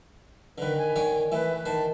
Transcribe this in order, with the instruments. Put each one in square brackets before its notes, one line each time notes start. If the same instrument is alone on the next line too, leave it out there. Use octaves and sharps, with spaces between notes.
[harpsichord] D3 D#3 [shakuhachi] B4
[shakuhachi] G#5
[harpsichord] D#3 C#5 D5
[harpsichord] E3 A3 [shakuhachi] B4
[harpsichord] D#3 C5 [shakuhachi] A5